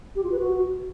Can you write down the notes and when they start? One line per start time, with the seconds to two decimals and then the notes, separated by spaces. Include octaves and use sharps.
0.16 G4
0.23 F4
0.31 B4
0.39 F#4